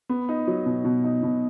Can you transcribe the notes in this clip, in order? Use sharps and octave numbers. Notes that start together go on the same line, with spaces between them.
B3
D#4
F#3
B2
B2
D#4
B2